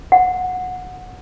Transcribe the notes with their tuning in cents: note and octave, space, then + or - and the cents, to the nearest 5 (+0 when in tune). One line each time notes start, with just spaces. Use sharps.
F#5 -15